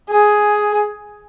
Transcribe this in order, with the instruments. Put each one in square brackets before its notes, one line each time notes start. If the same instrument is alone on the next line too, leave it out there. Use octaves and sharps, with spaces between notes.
[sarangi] G#4